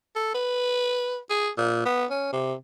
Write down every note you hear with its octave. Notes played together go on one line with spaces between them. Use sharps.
A4
B4
G#4
A#2
B3
C#4
C3